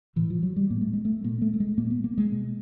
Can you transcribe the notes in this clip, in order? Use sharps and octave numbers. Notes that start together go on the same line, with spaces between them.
A2 E3
F3
F#3
G3
A2 A#3
A3
G#3
A3
A#2 A#3
A3
A3
G#3
A#2 A#3
B3
A#3
G#3
B2